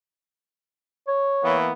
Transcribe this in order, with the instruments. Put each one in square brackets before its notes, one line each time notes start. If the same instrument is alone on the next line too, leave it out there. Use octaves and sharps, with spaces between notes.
[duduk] C#5
[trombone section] E3 A#3 B3